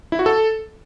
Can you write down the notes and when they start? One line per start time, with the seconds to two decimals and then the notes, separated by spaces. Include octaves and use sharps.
0.12 E4
0.19 F#4
0.26 A4